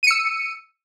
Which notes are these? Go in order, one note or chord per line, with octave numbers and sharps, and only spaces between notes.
E6 C#7 D#7